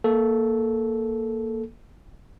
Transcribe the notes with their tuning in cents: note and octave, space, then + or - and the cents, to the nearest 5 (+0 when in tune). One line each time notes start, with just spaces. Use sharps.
A#3 +0 A4 -10